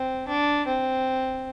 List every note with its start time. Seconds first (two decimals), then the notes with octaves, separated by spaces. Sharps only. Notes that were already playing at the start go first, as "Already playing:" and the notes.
Already playing: C4
0.28 D4
0.67 C4